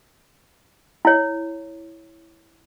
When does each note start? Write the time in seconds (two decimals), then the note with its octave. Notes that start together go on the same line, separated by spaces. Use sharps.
1.05 E4 C#5